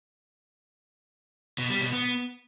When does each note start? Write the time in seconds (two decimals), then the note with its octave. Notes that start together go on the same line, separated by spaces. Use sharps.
1.58 B2
1.70 G3
1.81 B2
1.93 B3